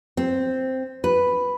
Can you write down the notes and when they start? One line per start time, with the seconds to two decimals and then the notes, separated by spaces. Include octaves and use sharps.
0.17 C4
1.04 B4